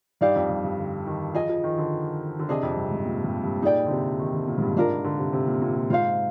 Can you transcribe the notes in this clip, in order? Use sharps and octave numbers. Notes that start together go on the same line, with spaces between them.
G2 D#4 G4 D5 F5
F2
G2
G2
D3
D#3
F3 G#4 D#5 G#5
F3
D#3
D3
D3
C3 D4 G#4 D#5 G#5
F2
G2
G#2
A#2
G2
G2
A#2 D#4 G#4 D5 G5
D3
C3
D#3
D3
A#2
G#2
G2
G#2 D4 F4 A#4
D3
C3
C3
A#2
A#2
A#2
G#2 F4 C5 F5